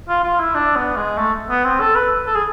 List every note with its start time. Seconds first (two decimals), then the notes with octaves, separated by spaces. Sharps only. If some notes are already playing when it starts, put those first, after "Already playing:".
0.09 F4
0.24 F4
0.39 E4
0.55 D4
0.75 B3
0.97 G#3
1.18 A3
1.49 B3
1.65 C4
1.80 A4
1.95 B4
2.26 A4
2.35 G#4